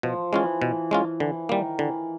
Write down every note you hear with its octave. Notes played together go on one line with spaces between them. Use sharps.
B2 F3
E3 G#3 C#4 F4
B2
G#3 C#4 F4
D3 E3
D#3 G3 A#3
D3 E3